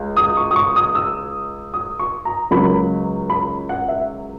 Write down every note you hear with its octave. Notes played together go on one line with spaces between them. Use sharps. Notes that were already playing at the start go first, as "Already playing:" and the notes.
Already playing: C#2
D#6
C#6
D#6
C#6
D#6
E6
D#6
C#6
A#5
C#2 C#3 F#3 A#3 B5
B5
F#5
E5